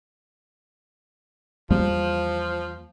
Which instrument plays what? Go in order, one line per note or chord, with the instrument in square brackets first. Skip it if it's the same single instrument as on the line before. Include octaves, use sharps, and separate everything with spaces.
[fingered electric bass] E2 G3 A#3 [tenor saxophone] F3